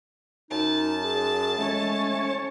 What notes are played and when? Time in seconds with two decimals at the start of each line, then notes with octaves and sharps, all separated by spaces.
0.51 F#2 D#4 A5
1.04 G#4
1.58 G#3 A3 C#4 C#5